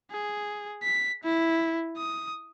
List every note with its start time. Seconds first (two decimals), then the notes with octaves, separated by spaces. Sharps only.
0.11 G#4
0.83 B6
1.24 E4
1.97 D#6